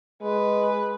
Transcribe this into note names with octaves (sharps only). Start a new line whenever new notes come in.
G#3 B4